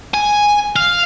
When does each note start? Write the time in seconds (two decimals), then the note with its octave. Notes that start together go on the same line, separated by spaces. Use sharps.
0.14 G#5
0.76 F5